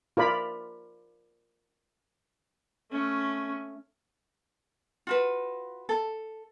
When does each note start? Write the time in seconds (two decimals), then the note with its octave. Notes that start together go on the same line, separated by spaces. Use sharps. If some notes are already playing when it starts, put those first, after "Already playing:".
0.17 F4 A#4 D5 B5
2.91 A3 C#4
5.07 F4 F#4 B4
5.89 A4